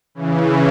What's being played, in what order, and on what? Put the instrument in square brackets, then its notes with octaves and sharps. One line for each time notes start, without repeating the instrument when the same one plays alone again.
[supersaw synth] C#3 E3